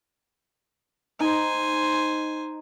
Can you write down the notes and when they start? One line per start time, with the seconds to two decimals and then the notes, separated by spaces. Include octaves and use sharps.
1.20 D#4 C5 G#5